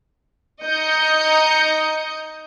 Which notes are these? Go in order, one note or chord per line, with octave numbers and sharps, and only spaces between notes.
D#4 D#5 G6 C#7